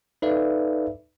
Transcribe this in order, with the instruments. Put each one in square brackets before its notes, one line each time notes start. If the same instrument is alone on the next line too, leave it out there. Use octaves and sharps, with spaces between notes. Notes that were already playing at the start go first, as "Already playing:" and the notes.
[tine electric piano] D#4 A4 B4 D5 E5 F5